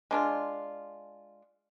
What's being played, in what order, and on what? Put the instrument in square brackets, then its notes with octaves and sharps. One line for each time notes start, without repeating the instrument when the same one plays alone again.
[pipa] G#3 D4 F4